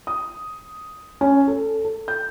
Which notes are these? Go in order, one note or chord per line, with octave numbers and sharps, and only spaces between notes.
D#6
C#4
A4
A4
G6